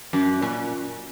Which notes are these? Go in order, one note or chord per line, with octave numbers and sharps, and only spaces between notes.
F#2
A#2